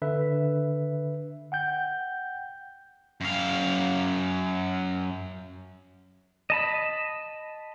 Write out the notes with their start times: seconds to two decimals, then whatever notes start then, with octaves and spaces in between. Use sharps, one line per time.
0.02 D3 B4 E5
1.52 F#5 G5 G6
3.21 F#2 F5
6.50 D#5 A5 B5